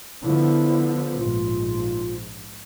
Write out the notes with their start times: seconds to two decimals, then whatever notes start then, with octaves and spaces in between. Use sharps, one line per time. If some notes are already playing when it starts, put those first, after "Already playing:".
0.24 D3 F3 B3 E4
1.19 A#1 G#2 F4